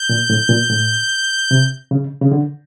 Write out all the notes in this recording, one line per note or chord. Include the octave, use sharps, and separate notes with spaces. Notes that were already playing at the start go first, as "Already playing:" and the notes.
Already playing: G6
A#2
A2
A#2
A2
C3
C#3
C#3
D3